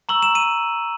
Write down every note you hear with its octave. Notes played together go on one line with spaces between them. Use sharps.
A#5 C#6 E6 F#7
E7
D#7